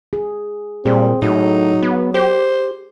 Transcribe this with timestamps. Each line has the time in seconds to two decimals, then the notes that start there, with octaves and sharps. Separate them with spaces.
0.13 G#4
0.86 A#2 G3 C4 G#4
1.22 A2 F#3 D#4
1.82 B3
2.14 G4 C5